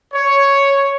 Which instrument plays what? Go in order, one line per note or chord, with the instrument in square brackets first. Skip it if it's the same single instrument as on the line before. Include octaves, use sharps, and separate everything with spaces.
[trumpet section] C#5